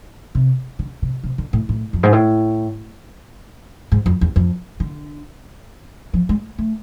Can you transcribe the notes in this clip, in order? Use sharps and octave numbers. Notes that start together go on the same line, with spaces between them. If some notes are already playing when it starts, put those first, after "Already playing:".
C3
D3
C3
C3
D3
A2
A2
F2
G#2
A2
G#2
F2
E2
F2
D3
F3
G#3
A3